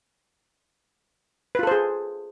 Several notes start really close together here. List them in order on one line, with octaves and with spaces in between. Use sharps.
B4 F4 A4 C5 G#4